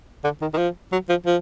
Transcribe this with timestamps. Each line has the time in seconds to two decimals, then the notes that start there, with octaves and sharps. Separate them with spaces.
0.24 D3
0.41 D#3
0.54 D#3
0.57 F3
0.92 F#3
1.09 F3
1.26 F3